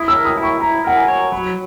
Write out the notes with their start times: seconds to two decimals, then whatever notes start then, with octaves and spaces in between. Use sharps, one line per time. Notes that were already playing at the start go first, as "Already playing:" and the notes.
Already playing: E4 D#6
0.08 E6
0.14 A#4
0.25 D#6
0.37 E4
0.43 C#6
0.61 E4 A#5
0.84 A#4 F#5
0.96 G#5
1.08 C#5
1.32 F#3 B5